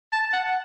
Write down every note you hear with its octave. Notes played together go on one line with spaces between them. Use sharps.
A5
F#5